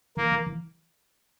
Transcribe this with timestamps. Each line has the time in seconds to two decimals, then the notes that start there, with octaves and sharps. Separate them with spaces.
0.17 E3 A#3
0.32 E3
0.47 E3